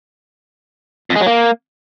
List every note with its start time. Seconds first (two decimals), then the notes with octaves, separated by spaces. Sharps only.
1.10 F2
1.16 G#3
1.21 F#3
1.26 A#3